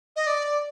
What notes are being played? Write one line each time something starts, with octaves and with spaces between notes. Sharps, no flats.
D#5
D5